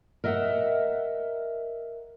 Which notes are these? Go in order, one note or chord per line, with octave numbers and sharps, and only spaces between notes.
A#4 D#5 E5 F#5